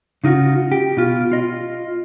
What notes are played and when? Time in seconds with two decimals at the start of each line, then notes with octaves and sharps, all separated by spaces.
0.24 C#3 D#4 F4 F#4
0.72 G4
0.97 B2 F4
1.32 F4 D#5